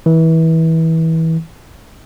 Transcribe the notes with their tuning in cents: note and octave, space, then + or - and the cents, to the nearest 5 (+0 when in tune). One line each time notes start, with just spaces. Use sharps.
E3 -25